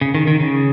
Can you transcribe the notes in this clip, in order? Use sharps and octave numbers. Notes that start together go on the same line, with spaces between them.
C#3
D#3
D#3
C#3